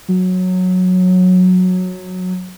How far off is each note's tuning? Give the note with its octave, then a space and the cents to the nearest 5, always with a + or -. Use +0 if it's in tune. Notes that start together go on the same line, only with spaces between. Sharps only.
F#3 -15